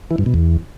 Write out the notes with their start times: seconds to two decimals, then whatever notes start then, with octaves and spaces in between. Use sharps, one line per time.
0.11 E3
0.18 G2
0.26 B2
0.34 E2